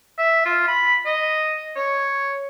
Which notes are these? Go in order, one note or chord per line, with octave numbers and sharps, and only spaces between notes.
E5
F4
B5
D#5
C#5